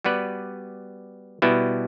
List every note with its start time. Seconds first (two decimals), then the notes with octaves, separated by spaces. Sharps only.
0.04 G3 B3 F#4 B4 D5
1.42 B2 G3 B3 E4